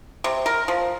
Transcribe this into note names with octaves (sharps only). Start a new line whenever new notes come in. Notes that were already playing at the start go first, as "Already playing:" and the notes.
C3
A#4
F3